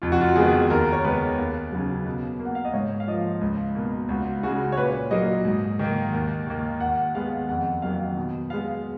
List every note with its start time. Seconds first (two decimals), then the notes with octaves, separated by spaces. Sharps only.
0.02 F2 F4
0.12 F#4
0.21 F4
0.36 D#3 G#3 B3 G#4
0.70 D#2 A#4
0.92 C#5
1.04 D#3 G#3 B3 B4
1.38 D#2
1.72 C#3 F#3
2.06 B2
2.39 A#3
2.45 F#5
2.55 F5
2.65 D#5
2.73 G#2 C#5
3.00 F5
3.07 F3 A#3 D#5
3.41 C#2
3.75 B2 A#3
4.09 C#2 F#4
4.43 C#3 G#3 F#4
4.72 C#5
4.77 A#2 B4
5.11 F#3 A#3 D#5
5.45 G#2
5.79 D#3 A#3
6.13 D#2
6.47 D#3 A#3
6.80 D#2 F#5
7.14 D#3 G#3 B3 F5
7.49 F2 F#5
7.82 D#3 F#3 A#3 F5
8.17 B2
8.50 G#3 B3 F5